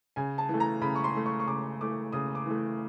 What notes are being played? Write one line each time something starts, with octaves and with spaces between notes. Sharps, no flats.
C#3 G#5
A5
E3 A3
A#5
C#3 B5
C#6
C6
E3 A3
C#6
C#6
C#3 D6
E3 A3 D6
C#3 D#6
D6
E3 A3